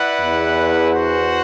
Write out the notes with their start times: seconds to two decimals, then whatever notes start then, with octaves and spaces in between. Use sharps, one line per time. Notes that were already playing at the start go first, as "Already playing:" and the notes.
Already playing: E4 B4 D5 F#5
0.21 E2
0.91 F#4 C5 F#5